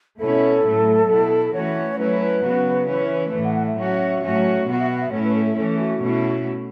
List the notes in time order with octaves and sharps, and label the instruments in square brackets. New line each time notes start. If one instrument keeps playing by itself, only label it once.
[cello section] B2 A3 C#4 E4 [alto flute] A4
[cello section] A2 F#3 A3
B2 B3 E4
[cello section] E3 A3 C#4 F#4 [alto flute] C#5
[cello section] F#3 A3 C#4 E4 [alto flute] B4
[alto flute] B4
[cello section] C#3 F#3 B3 F#4
E3 C#4 E4
A2 E3 A3
[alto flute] F#5
F#5
E5
[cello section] F#3 C#4 F#4
A2 F#3 C#4 F#4
[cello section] B2 B3 F#4 [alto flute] F#5
[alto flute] E5
F#5
E5
[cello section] A2 A3 C#4 E4 [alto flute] C#5
[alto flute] B4
A4
A4
[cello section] E3 A3 C#4 [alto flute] A4
[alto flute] F#4
[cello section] B2 A3 C#4 E4